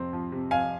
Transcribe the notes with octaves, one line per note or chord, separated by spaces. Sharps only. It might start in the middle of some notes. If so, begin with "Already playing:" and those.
Already playing: F2 C3 C4
F3
C3
F2 F5 G#5